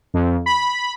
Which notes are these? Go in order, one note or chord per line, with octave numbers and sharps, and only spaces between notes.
F2
B5